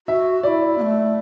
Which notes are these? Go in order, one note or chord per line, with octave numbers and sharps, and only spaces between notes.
F#4 E5
E4 F#4 D5
B3
A3